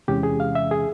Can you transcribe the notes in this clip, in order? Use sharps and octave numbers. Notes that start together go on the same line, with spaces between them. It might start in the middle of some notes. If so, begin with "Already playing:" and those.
E2 C3 E3 G#3 C#4 G4
G#4
F5
E5
G#4